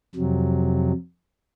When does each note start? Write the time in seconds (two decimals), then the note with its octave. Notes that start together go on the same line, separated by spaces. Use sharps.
0.15 F2 C3 F#3